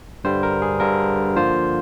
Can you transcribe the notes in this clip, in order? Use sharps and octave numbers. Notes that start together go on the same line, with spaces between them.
G2 D3 G3 C5
A#4
G#4
G2 D3 G3 A#4
D3 F3 A#3 F4 C5